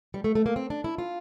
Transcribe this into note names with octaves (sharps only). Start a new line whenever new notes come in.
G3
A3
A3
A#3
C4
D4
E4
F4